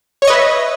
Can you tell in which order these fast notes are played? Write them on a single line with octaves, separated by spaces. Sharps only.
C#5 C#6 D#5 B4 E5